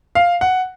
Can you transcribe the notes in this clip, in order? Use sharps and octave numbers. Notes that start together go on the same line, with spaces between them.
F5
F#5